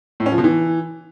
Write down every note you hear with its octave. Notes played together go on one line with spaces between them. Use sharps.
A2
C#4
F3
B2
E3